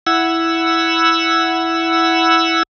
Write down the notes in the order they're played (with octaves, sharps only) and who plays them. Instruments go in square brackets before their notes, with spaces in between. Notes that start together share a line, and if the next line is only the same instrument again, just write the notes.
[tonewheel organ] E4 F#5 E6